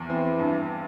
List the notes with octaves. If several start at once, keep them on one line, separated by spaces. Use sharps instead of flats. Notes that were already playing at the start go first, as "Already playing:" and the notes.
Already playing: E2
E3 C4
G2